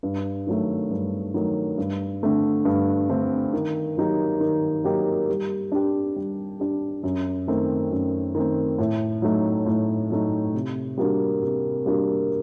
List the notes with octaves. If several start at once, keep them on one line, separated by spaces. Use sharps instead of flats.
G2
D#3 F#3 A3
G2
D#3 F#3 A3
G2
D3 A3 C4
G2
D3 A3 C4
D#3
F#3 A#3 D#4 G4
D#3
F#3 A#3 D#4 G4
G3
D4 G4
G3
D4 G4
F#2
D#3 A3 C4
F#2
D#3 A3 C4
A2
F#3 A3 D#4
A2
F#3 A3 D#4
C3
G3 A#3 D4 F#4
C3
G3 A#3 D4 F#4